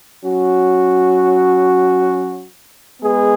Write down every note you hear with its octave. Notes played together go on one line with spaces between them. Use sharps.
F#3 C#4 F#4
G#3 B3 G#4 B4